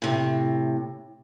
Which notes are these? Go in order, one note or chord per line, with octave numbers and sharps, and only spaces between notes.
A2 C3